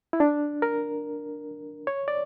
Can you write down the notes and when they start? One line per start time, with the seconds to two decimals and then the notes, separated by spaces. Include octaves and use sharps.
0.13 E4
0.20 D4
0.62 A#4
1.87 C#5
2.08 D5